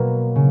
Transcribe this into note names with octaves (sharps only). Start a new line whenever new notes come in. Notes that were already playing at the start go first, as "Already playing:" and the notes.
Already playing: B2 F#3 A#3
C#3